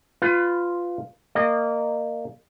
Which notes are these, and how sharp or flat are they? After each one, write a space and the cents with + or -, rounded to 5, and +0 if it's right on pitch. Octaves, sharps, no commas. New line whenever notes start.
F4 +0 B4 +30
A#3 -15 D#5 -30